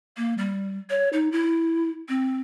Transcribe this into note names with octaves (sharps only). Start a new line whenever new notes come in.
A#3
G3
C#5
D#4
E4
C4